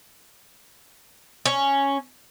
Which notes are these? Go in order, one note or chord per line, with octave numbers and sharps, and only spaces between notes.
C#4